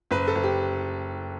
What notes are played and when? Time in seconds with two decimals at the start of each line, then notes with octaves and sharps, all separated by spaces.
0.11 F#1 B4
0.28 A4
0.35 F#1
0.43 G4